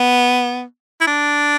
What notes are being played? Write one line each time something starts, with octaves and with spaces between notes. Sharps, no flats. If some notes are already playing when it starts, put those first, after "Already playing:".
Already playing: B3
E4
D4